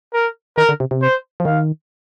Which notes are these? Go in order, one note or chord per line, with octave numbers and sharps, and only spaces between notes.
A#4
D#3 A#4
D3
C3
C3
C5
F3
D#3 F5